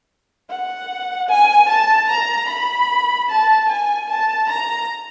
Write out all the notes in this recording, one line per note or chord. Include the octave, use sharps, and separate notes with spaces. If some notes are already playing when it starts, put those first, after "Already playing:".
F#5
G#5
A5
A#5
B5
A5
G#5
A5
A#5